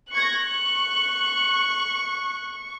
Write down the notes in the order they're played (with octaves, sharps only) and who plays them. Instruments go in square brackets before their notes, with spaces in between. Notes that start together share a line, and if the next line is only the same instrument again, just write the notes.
[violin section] C#6 G#6 A#6 [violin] F#6
[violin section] C#6